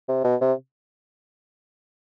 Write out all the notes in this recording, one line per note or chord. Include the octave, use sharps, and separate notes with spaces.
C3
B2
C3